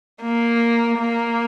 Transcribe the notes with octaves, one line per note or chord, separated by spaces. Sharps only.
A#3
A#3